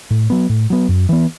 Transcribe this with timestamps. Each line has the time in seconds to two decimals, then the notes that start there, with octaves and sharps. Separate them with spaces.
0.11 A2
0.30 F#3 B3
0.49 A2
0.70 F#3 B3
0.89 F#2
1.09 E3 B3